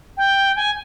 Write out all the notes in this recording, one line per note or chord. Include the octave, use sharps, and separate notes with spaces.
G5
G#5